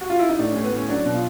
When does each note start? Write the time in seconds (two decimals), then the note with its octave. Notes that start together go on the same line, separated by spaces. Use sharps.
0.01 F#4
0.10 F4
0.19 E4
0.29 D#4
0.38 A2 D4
0.51 A2 C#4
0.64 B3
0.71 A2 C#4
0.89 F#3 D4
1.05 B2
1.14 F4